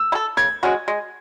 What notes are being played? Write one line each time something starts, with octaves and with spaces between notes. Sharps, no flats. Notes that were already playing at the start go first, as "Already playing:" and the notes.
Already playing: E6
E4
A4
C#3 G#6
G#3 C#4 F#4
G#3